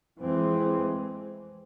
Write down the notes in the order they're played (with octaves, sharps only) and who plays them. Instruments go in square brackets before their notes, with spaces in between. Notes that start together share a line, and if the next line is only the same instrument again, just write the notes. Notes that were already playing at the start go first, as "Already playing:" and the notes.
[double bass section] F2 E3 G#3 C4